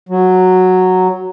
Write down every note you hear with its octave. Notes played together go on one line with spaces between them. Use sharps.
F#3